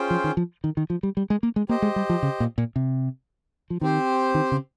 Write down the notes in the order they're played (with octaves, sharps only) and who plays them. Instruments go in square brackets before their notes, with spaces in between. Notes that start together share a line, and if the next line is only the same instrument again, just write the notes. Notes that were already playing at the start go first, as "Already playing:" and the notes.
Already playing: [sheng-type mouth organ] C#4 F4 G#4 C5 G5
[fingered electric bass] F3
D#3
F3
D#3
D#3
F3
G3
G3
G#3
A#3
G#3
[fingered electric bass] A#3 [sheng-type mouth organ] G4 C5 D#5
[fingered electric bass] G#3
G3
F3
C#3
A#2
A#2
C3
F3
[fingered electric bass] D#3 [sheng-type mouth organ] C4 G4 C5
[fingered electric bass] D#3
C#3